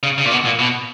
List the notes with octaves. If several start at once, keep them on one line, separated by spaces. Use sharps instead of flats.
C#3
C#3
A#2
B2
A#2
B2